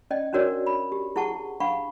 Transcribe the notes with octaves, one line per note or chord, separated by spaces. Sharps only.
C#4 D5 D#5 G5
C#4 D4 F#4 A#4 C#5 D5
B5
G4
E4 G#4 F#5 A5 C#6
D4 F5 F#5 B5 C#6